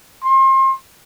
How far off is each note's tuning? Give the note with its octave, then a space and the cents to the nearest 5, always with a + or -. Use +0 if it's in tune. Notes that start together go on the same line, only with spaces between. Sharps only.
C6 +35